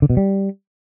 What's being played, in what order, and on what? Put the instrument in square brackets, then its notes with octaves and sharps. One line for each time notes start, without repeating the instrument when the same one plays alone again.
[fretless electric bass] D3
B2
G3